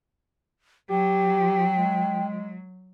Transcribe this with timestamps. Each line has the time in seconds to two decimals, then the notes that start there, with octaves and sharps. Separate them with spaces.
0.90 F#3 G4 G5
1.78 G#3